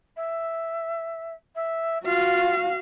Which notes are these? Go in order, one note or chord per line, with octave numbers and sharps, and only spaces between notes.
E5
E5
F4 F#4 F5